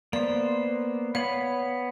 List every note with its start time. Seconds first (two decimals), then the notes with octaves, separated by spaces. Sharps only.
0.13 A#3 B3 C5 D5
1.15 B3 C#5 F5 B5